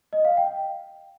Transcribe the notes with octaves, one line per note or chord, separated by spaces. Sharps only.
D#5
F5
G5